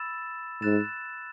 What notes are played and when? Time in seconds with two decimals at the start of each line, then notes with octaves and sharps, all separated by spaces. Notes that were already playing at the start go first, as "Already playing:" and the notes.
Already playing: B5 E6 A6 E7
0.62 G#2 F#6 A6 E7